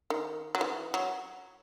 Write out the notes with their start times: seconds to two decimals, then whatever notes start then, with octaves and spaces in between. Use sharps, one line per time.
0.10 D#3
0.55 F#3
0.61 E3
0.94 F#3